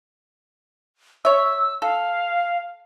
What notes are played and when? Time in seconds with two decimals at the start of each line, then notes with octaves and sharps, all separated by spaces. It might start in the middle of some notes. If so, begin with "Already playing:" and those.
1.25 C#5 E5 E6
1.82 A4 F5